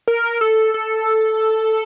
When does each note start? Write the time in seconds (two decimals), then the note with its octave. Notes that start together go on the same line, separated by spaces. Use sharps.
0.08 A#4
0.41 A4
0.74 A4